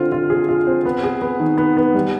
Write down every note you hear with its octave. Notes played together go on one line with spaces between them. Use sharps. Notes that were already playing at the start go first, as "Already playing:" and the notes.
Already playing: D3 C4 F4
F4
G#4
F4
C4
B3
G#4
B3
D#3
B3
B3
G3